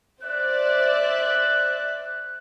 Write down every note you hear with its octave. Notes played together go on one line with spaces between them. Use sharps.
C5 D5 E5 F#6